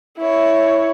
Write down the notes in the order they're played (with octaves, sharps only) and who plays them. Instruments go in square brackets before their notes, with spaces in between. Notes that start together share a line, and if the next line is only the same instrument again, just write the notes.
[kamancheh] E4 C#5